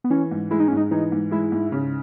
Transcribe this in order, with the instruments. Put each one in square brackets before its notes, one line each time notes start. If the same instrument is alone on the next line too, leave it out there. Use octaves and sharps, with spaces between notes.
[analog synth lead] B3
[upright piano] E3 [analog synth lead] C#4
[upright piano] G#2
[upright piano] G#3 [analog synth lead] E4
[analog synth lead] D#4
C#4
[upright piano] G#2
[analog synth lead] D#4
[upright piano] E3 [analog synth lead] D#4
[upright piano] G#2
[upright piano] G#3 [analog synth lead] E4
[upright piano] G#2
C#3